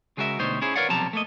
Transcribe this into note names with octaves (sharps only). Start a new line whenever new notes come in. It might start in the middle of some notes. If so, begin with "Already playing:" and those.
C#3 G#3 F#4 A#4 E5
D2 B2 G3 D#4 C5 C#5
C#4 E4 G#4 C5
A#4 B4 C#5 D5 F5 F#5
B1 C3 F3 G3 A5 A#5
A3 A#3 D#5